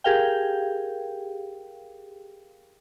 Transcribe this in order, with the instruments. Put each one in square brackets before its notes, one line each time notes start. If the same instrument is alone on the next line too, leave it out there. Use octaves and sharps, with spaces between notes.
[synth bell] G4 G#4 A#4 F5 G5